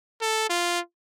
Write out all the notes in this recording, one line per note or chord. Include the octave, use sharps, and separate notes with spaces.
A4
F4